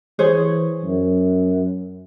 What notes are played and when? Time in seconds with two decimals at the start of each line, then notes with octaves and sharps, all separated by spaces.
0.19 E3 G#4 C5 C#5
0.84 F#2